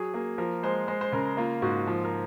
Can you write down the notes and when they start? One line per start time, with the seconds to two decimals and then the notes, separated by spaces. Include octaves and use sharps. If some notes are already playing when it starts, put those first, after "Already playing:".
Already playing: F#3 G#4
0.14 A#3 G#4
0.38 F3 A#4
0.63 G#3 C5
0.88 G#3 C5
1.01 C5
1.12 C#3 A#4
1.37 A#3 F4
1.62 G#2 F#4
1.87 F3
2.04 A#4